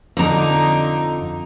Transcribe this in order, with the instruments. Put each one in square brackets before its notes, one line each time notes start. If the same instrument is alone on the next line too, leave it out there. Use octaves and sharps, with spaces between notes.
[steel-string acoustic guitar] F2 A#5 [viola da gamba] D3 D#4